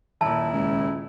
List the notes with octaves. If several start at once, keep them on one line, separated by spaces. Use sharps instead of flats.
D#1 A#2 E4 A5
C#2